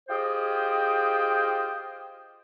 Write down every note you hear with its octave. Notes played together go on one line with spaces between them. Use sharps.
F4 G4 G#4 C5 D#5 G5